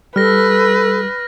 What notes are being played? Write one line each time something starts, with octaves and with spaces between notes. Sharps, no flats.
G3 A4 B4 F6 A#6